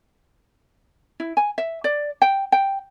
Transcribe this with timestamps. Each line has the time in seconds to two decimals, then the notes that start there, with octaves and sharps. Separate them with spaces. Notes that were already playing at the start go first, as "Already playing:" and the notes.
1.20 E4
1.37 G#5
1.58 E5
1.84 D5
2.22 G5
2.52 G5